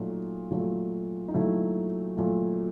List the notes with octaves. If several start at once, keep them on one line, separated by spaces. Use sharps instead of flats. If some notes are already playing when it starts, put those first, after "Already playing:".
Already playing: A#2 F#3 A3 D#4
A#2 F#3 A3
D#4
A#2 F#3 A3 E4
A#2 F#3 A3